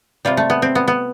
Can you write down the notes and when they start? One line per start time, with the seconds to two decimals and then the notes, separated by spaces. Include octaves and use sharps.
0.25 C3 G3 F4
0.37 A3
0.50 B3
0.62 C4
0.75 B3
0.88 B3